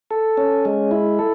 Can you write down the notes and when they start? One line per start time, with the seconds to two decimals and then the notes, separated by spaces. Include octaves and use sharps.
0.11 A4
0.37 C#4
0.65 G#3
0.91 E4
1.19 A4